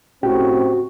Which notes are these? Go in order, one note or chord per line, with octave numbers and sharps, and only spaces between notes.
A2 C4 C#4 F#4 G4 G5